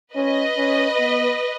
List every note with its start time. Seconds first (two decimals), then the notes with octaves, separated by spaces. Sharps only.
0.15 C#4 B4 D#5
0.57 C#4
0.99 B3